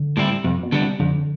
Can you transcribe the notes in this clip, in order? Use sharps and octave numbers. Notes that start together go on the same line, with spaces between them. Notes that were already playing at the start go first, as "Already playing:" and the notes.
Already playing: D3
A2 G3 C4 E4
F2 C3
B2
D3 G3 B3 D4
C3
F2 D3